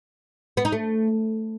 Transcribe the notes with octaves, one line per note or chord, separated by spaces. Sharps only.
B3
D#4
A3